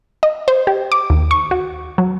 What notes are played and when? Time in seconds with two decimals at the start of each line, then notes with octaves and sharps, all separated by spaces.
0.23 D#5
0.48 C5
0.67 G4
0.92 D6
1.10 D#2
1.31 C#6
1.51 F#4
1.98 F#3